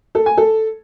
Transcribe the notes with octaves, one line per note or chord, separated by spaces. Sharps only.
A4
G#5
A4